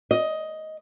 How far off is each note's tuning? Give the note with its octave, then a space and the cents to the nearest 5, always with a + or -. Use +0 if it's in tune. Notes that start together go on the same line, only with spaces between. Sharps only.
D#5 +10